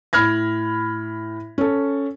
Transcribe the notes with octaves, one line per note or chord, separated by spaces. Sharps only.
A2 B5 F6 G#6 A#6
C#4 A4